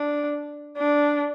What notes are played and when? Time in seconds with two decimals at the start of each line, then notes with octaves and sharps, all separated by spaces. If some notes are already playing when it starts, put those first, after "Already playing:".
Already playing: D4
0.78 D4